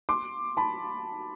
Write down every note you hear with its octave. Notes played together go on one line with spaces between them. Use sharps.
C6 D6
A5 B5